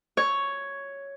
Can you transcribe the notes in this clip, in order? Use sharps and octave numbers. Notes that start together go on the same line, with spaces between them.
C#5